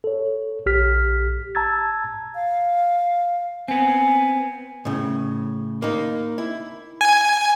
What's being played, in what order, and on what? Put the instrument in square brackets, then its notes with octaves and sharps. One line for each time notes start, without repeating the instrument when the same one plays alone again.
[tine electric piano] A4 C#5
A#1 G4 F6 B6
A5 A#5 E6 G#6 A6
[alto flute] F5
[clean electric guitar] B3 C4 [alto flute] G#5
[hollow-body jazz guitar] A2 C#3
A#3 D#4
E4
[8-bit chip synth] G#5